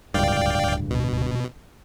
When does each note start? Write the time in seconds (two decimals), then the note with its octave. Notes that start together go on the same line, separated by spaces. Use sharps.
0.14 D1 C#2 G2 D5 F5 G5
0.91 B2